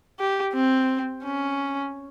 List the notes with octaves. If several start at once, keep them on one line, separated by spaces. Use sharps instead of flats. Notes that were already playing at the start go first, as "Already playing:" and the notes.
G4
C4
C#4